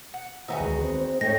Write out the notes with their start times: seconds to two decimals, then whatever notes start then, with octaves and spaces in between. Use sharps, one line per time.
0.14 F#5
0.48 E2 D#3 B3 D#4 F#4 G#4 E5
0.60 D2 G#3
0.84 C4
1.21 G#2 A3 D#4 G4 C#5 A#6